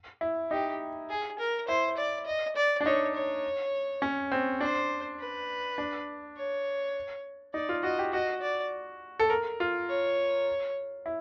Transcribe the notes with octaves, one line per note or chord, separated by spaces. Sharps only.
E4
D#4 G4
G#4
A#4
E4 C5
D5
D#5
D5
D4
D#4 C#5
C#5
C#4
C4
D4 C5
B4
D4
C#5
D#4 D5
F4
F#4 D#5
G4
F#4 D#5
D5
A4
A#4
F4
C#5
E4